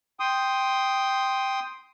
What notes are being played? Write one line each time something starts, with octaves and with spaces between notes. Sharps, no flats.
G5 C6 D#6